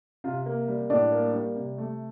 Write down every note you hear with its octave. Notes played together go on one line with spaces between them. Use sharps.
C3 F4
A#3
G3
A2 D4 D5
A#3
G3
C3
A3